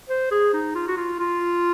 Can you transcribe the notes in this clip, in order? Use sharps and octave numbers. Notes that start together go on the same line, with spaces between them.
C5
G#4
D#4
F4
F#4
F4
F4